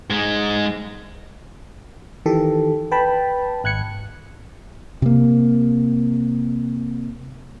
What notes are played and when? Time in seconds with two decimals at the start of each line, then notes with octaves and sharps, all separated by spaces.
0.10 G#2 G#3
2.26 D#3 E3 G4 A4
2.91 B4 G5 A5 B5
3.64 G#1 F#6 G#6 C#7
5.02 C3 A#3